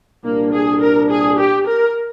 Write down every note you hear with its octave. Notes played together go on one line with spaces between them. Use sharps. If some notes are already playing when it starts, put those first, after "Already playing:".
C2 A#2 G3 A#3 D4
G#4
A#4
G#4
G4
A#4